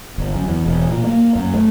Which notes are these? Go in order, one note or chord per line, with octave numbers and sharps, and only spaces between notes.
G1
F#2
E2
E1
A#2
A#3
F#2
A3